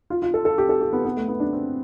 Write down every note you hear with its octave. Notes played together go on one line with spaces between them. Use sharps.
F4
F4
A4
A4
G4
A4
G4
B3
B3
A3
B3
D4
C4